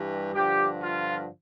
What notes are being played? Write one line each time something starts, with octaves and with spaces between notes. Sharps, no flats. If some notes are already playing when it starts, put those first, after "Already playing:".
Already playing: G2 E3 G3
G2 D3 F3 G4
F4